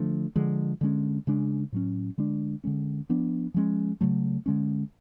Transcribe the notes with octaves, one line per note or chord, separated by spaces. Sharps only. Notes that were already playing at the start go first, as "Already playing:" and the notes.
Already playing: D3 F3 A3 D4
D3 F3 G#3
D3 G#3 C#4
C#3 G#3 D4
A2 F#3 C#4
D3 G#3 D4
D3 G#3 C#4
F3 B3 D4
F3 G#3 C#4
C#3 F#3 A3
D3 G#3 C#4